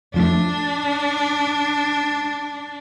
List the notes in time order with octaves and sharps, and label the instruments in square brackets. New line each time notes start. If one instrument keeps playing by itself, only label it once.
[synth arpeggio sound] F2 F3 A3 [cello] D4